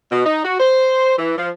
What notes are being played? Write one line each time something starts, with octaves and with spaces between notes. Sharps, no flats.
B2
D#4
F#4
C5
E3
F3